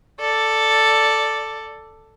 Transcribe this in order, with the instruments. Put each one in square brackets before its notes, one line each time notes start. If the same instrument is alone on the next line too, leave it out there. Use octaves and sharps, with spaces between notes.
[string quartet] A4 D5